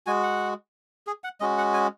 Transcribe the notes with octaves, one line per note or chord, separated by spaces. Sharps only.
G#3 F#4 G#5
F#5
G#4
F#5
G#3 C#4 F#4 D#5
F#5
G#5